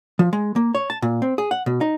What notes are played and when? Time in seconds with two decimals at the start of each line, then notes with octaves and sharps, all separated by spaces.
0.19 F3
0.33 G#3
0.56 A#3
0.75 C#5
0.90 A5
1.02 A#2
1.22 C4
1.38 G#4
1.51 F#5
1.66 B2
1.81 D#4